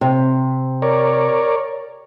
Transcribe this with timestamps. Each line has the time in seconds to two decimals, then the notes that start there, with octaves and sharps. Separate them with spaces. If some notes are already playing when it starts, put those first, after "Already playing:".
0.01 C3
0.82 A#4 C#5 D5